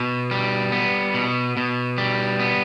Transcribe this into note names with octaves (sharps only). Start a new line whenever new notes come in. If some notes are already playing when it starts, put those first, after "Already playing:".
Already playing: B2
G3
B3
B2
B2
G3
B3